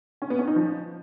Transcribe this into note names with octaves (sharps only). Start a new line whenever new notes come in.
C#4
B3
C#4
D#4
F3